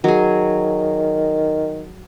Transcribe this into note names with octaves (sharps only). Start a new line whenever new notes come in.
D#3 F#3 G#4